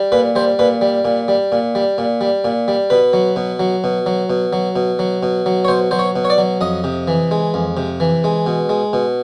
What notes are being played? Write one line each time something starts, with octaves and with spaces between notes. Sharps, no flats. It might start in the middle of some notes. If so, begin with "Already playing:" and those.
Already playing: G3
A#2 B4
G3 C5
A#2 B4
G3
A#2
G3
A#2
G3
A#2
G3
A#2
G3
B2 B4
F#3
B2
F#3
B2
F#3
B2
F#3
B2
F#3
B2
F#3
C#5
B2 C5
F#3 C5
C#5
B2
C#5
D5
F#3
F2 D#5
C3
E3
G#3
F2
C3
E3
G#3
B2
G#3
B2